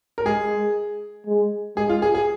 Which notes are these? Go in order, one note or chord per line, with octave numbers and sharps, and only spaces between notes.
A#4
G#3 G#4
G#3
G#3 G#4
F4
G#4
G#4